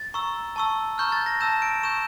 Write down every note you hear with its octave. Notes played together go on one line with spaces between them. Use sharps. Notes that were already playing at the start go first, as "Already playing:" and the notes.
Already playing: A6
A#5 C#6 E6
A5 C#6 E6
A#5 C#6 F6 G6
A6
A#6
A5 E6 G6 E7
D7
C#6 E6 G6 E7